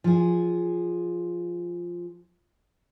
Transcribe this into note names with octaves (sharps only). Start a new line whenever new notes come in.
F3 G#4